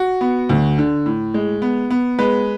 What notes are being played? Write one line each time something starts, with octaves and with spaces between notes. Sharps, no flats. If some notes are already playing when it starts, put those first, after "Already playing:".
Already playing: F#4
B3
D2
D3
A2
G#3
B3
B3
G#3 B4